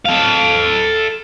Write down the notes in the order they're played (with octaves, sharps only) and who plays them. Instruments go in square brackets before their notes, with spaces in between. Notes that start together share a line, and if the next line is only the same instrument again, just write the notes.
[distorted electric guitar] A4 F5